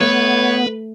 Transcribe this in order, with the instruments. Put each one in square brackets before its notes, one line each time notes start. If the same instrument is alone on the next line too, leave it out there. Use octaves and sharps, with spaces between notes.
[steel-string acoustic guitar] A3 [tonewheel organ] B3 [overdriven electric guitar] B4 [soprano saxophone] C#5